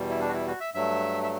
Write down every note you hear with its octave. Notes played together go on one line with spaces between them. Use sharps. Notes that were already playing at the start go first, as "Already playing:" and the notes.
Already playing: E2 B2 G3
E4
D4
F#4
E4
F#4
E5
G2 F#3 A3 E5
E5